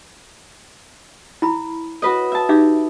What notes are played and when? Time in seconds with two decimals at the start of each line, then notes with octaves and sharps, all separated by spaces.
1.42 E4 B5
2.02 F#4 B4 D#5
2.32 E5 A5
2.49 D#4 G4 E5 D6